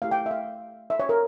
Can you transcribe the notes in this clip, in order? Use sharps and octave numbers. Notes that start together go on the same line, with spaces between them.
A3 E4 G4 F5
G5
E5
F5
E5
C#5
A#4